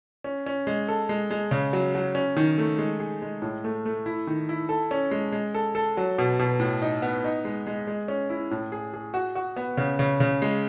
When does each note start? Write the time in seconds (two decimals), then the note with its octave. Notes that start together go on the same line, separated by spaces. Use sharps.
0.24 C#4
0.46 C#4
0.67 G#3
0.88 A4
1.09 G#3
1.31 G#3
1.51 C#3
1.73 F#3
1.95 F#3
2.15 C#4
2.37 D#3
2.58 A3
2.78 G#3
3.00 G#4
3.22 G#3
3.42 A2
3.64 A3
3.85 A3
4.06 E4
4.27 D#3
4.49 E4
4.69 A4
4.91 C#4
5.11 G#3
5.32 G#3
5.54 A4
5.75 A4
5.97 F#3
6.18 B2
6.39 B2
6.60 A2
6.82 D#4
7.02 B3
7.24 D#4
7.45 G#3
7.67 G#3
7.87 G#3
8.08 C#4
8.30 E4
8.51 A2
8.72 G#4
8.94 G#4
9.14 F#4
9.35 F#4
9.56 B3
9.77 C#3
9.99 C#3
10.20 C#3
10.42 G#3